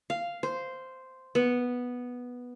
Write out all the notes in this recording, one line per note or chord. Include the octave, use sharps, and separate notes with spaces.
F5
C5
B3